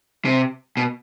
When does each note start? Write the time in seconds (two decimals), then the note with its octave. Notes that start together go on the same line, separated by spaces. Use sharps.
0.25 C3
0.77 B2